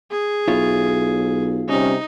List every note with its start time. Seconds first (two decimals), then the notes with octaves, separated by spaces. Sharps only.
0.11 G#4
0.48 B1 E4 F4 C#5
1.69 C3 G3 C#4 D#4